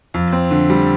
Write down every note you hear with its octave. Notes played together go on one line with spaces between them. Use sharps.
F2
C4
D3
G3